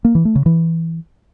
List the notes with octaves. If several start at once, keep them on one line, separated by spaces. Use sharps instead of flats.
A#3
E3
A3
C#3
E3